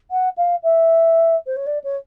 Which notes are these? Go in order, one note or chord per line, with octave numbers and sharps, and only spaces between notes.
F#5
F5
E5
C5
C#5
D5
C#5